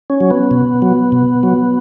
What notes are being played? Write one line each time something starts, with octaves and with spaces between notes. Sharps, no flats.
C#4
F#3
B3
B2
F#3
B2
F#3